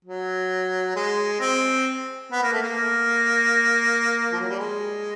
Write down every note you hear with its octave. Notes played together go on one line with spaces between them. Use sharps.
F#3
G#3
C4
B3
A#3
A3
A#3
F3
F#3
G3
G#3